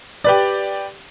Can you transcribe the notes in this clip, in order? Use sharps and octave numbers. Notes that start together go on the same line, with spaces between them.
G4 B4 D5